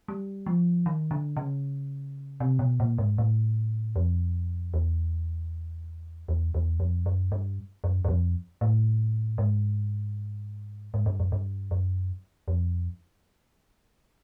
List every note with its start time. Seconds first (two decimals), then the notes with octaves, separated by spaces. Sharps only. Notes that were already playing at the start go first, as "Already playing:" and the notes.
0.08 G3
0.46 F3
0.86 D#3
1.11 D3
1.37 C#3
2.40 C3
2.59 B2
2.80 A#2
2.98 G#2
3.18 A2
3.96 F2
4.74 E2
6.28 E2
6.54 E2
6.80 F2
7.06 F#2
7.32 G2
7.84 F#2
8.04 F#2
8.08 F2
8.61 A2
9.38 G#2
10.94 G#2
11.06 G2
11.20 F#2
11.32 G2
11.71 F#2
12.48 F2